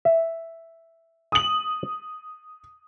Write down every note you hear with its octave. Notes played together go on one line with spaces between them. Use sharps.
E5
D#6 F#7